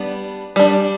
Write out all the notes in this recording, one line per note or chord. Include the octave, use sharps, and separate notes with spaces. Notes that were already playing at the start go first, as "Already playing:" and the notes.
Already playing: G3 B3 D4
G3 D4